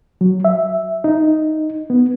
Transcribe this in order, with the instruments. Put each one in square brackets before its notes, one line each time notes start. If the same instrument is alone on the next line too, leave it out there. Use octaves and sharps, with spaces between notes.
[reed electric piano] F#3
E5
D#4
B3